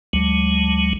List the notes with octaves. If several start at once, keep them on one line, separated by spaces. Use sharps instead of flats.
D2 F#3 G#3